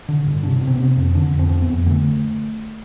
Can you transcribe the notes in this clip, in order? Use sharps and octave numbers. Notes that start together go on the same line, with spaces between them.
D3
G2
C3 D4
C3
C4
B3
C3 C4
C4
F2
D3 D4
F2
C4
F2
B3
F2
D3 A3